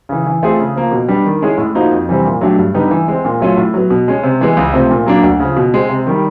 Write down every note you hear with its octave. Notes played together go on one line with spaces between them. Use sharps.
C#3 E3
E3
A3 C4 F4 G#4
C#3
F3 A#3
B2
G3 B3 D4
D#3
G#3 C#4 E4 G#4
A2
F3 A#3 D#4 F#4
F2
C3 E3 G3 C4
A#2
F#3 A3 D4 G4
G2
D3 G3 B3 D#4
E3
G#3 C4
A#2
F#3 A3 C#4 F4
A2
F#3 B3
B2
G#3 C#4
C3
E3 G#3 B3
C#2
C3 F3 A3 C4
A#2
F#3 A#3 D4
D2
C#3 F3
B2
G#3 C4
C3
D#3 G3